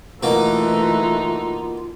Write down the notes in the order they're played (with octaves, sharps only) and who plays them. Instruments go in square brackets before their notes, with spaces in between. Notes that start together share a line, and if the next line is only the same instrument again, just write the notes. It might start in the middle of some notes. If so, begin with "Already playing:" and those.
[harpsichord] B2 A#3 [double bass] E3 A3 [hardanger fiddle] D#4 [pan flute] F4